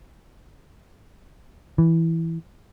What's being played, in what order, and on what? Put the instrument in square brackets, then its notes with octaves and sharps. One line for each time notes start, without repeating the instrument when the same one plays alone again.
[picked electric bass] E3